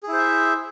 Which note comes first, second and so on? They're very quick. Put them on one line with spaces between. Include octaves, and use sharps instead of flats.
G#4 E4 C5 E5